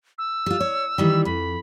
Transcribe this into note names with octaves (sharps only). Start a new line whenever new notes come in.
E6
G3 F4
C#5
D#3 E3 G3
F2 B5